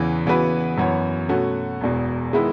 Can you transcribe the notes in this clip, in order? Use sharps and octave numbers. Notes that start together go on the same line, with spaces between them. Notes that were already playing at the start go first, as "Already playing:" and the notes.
Already playing: E2 C#3 E3 B3
C#3 E3 B3 F#4 B4
F#2 E3 B3 F#4 C#5
B2 A3 C#4 F#4
E1 E2 B2
D#3 G#3 B3 E4